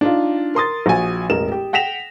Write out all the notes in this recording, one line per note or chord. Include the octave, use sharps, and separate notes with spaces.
D4 D#4 F4
A#4 C6 D#6 A6
A#1 F#4 G#5
E1 A1 A#4 E7
G4
F#5 G5 A#6 B6 E7 F7